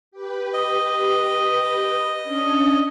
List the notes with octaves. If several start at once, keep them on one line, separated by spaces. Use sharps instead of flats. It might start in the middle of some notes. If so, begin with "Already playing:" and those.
G4 B4
D#5
C#4 D4